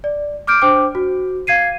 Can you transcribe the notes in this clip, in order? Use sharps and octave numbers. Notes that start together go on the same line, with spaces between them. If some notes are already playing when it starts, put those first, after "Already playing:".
D5
D6 F6 G6 D7
D4 C5 G5 D6
F#4
F5 G#6 C7 D#7